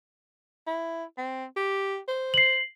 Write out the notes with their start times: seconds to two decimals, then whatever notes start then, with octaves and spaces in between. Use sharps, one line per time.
0.67 E4
1.18 C4
1.57 G4
2.08 C5
2.34 C7 F#7